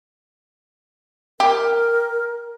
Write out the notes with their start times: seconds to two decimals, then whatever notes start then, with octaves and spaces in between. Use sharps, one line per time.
1.40 G4 A#4